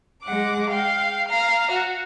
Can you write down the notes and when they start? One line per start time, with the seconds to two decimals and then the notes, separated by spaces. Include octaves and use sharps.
0.23 G#3 F#5 D6
0.70 F5 G5
1.29 F5 A#5 F6
1.71 F#4